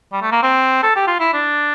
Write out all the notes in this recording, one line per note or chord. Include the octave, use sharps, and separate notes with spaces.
G3
A3
A#3
C4
A4
G4
F4
E4
D4